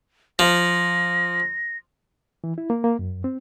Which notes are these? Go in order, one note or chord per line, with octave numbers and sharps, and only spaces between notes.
F3 A#6
E3
E4
A#3
A#3
F#2
C4